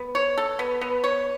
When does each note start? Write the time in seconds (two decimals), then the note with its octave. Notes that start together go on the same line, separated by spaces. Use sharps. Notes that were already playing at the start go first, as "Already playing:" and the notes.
Already playing: B3
0.15 C#5
0.38 A4
0.59 B3
0.81 B3
1.04 C#5